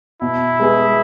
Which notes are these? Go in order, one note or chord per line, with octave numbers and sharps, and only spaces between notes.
B2 E4
G#3 B3 G#4